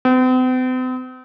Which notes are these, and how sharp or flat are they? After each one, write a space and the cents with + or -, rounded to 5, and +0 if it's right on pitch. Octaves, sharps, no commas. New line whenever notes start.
C4 -45